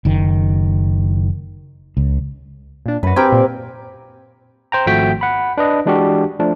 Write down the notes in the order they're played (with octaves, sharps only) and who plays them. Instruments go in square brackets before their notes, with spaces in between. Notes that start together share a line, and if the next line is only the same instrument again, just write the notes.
[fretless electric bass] F#1 D#3
C#2
[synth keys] A#2 D4
[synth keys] F#2 F#4 [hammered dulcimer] B4
[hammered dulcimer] C4 G4 A#4 [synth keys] G5 G#5
[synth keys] A#2
[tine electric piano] C5 G5 A#5
G#1 F3 A3 F#4 G5 B6
F#5 B5
D4 B4 D#5
E3 G#3 D4 F#4 G4
F3 A3 D4